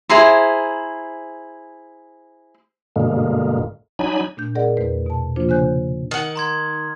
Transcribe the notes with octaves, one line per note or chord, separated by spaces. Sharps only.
E4 G#4 C5 A#5
G2 B2 D3 G#3 A#3
F#3 D4 D#4 G#5 B5
A#2 A3 D4 G6
G#4 A#4 D5 D#5 F#5
E2 A3 B4
B2 A5
C3 F3 A#3 D4 F4 C5
C#3 D4 C5 G#5 F#6 G6
D#3 F#5
A#5 C6 G#6